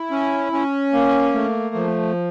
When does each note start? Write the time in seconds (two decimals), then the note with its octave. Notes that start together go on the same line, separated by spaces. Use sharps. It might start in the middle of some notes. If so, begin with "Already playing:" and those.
Already playing: E4
0.11 C#4
0.52 C#4
0.93 A#3
1.34 A3
1.75 F3